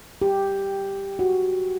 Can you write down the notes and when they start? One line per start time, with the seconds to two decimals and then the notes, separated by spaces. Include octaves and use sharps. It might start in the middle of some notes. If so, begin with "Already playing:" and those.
0.22 G4
1.19 F#4